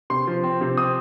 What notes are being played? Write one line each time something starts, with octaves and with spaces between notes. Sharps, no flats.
C3 C6
F3
C4
C3
C4 D#6